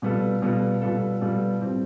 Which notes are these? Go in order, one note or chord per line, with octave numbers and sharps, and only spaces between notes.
B2 G3 B3 F4 A4
B2 G3 B3 F4 A4
B2 G3 B3 F4 A4
B2 G3 B3 F4 A4
A2 G3 C4 G4